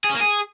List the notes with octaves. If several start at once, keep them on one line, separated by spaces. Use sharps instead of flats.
G#4
C#4
A#3
G#4